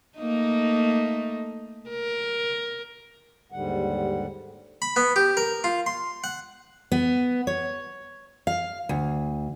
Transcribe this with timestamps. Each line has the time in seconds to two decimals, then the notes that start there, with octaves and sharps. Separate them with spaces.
0.19 A3 A#3 D#4
1.90 A#4
3.52 D#2 G#2 D3 G3 F#5
4.82 B5
4.96 B3
5.16 G4
5.37 A#4
5.64 F4
5.86 C6
6.24 F#5
6.92 B3
7.47 C#5
8.47 F5
8.89 D2